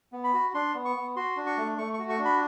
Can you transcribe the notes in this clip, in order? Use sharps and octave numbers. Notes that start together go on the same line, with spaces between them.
B3
B5
F#4
D4 C6
B3
C#6
B3
F#4 C6
D4
C#6
A3
A3 C#6
C#6
F#4
C#6
D4
B5